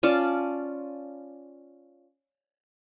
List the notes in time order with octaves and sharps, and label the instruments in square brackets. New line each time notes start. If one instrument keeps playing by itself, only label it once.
[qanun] C#4 F4 D5 A5